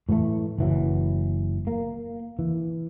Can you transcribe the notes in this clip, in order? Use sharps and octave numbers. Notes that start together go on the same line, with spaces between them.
A2 E3 F#3 A3
F#1 E3 F#3
A#3
E3